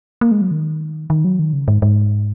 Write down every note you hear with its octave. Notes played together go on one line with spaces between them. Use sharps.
A#3
G#3
F#3
D#3
D#3
F#3
D#3
C#3
G#2
G#2